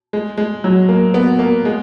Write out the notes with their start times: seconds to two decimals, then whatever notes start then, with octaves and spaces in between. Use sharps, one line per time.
0.13 G#3
0.38 G#3
0.64 F#3
0.89 A#3
1.14 B3
1.39 A#3
1.65 G#3